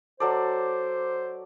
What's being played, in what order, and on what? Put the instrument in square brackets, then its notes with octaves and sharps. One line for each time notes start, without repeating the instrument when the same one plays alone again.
[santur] F#3 A4 D5 [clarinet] C5